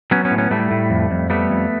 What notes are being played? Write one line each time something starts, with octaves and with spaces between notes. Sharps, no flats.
F#3 B3 C#4
B3 C#4
A2
B3 C#4
A2 G3 A3
A2
F2
F2
G3 A3 B3
F2